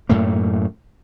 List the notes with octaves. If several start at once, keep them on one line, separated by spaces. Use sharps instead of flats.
F#2 A2 A3 A#3